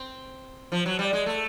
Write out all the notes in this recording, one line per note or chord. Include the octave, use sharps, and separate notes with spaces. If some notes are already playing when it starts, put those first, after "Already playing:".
Already playing: C4
F3
F#3
G3
G#3
A3